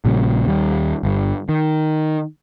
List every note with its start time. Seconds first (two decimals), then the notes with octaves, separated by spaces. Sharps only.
0.05 A#1 A#2 C#3 G3
0.46 D#2 G3
1.03 G1 G2
1.49 D#3